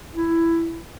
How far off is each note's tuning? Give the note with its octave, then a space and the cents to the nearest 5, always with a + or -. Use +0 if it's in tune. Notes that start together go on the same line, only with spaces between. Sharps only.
E4 +10